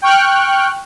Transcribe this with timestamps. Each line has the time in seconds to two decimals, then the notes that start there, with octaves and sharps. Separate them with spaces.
0.02 G5 C#6 F6 F#6